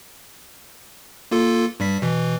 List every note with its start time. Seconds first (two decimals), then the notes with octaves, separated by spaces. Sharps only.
1.31 A#3 F4 A4
1.80 G2 G3 B6
2.02 B2 E3